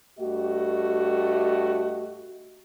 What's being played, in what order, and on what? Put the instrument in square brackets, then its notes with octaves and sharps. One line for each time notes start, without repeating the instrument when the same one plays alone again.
[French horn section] G2 A3 F#4 G4 D#5